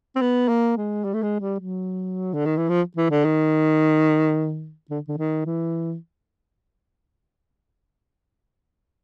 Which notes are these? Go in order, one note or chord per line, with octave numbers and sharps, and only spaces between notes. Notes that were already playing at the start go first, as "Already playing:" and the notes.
C4
B3
A#3
G#3
G3
A3
G#3
G3
F#3
D3
D#3
E3
F3
E3
D3
D#3
D3
D3
D#3
E3